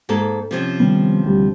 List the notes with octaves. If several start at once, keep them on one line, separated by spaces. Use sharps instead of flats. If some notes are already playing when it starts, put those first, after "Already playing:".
G#2 A#3 A4
C3 F3 C#4
D#3 G3 B3
D2 G3